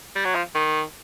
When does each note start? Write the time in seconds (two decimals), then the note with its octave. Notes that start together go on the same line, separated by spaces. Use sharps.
0.15 G3
0.25 F#3
0.35 F3
0.55 D#3